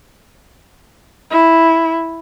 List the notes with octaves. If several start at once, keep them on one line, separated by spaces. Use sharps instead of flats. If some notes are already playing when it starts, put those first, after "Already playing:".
E4